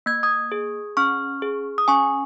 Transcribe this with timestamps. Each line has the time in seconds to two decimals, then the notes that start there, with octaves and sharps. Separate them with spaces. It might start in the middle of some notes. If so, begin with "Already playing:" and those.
0.06 A#3 G#6
0.23 D#6 G#6
0.52 G#4
0.97 C#4 C#6 F6
1.42 G#4
1.78 D#6
1.88 C#4 G#5 C#6